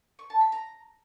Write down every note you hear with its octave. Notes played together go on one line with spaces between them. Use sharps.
C#6
A5
B5
A#5